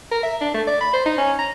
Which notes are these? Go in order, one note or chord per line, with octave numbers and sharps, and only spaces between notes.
A#4
E5
D4
A3
D5
B5
C5
D#4
C#4
A#5